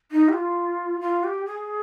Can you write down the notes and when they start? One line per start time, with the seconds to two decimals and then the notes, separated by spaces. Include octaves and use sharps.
0.11 D#4
0.28 G4
0.33 F4
1.01 F4
1.24 G4
1.46 G#4